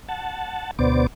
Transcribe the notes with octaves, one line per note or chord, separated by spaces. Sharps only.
F#5 A5
D2 B2 B3 C5 D5 D6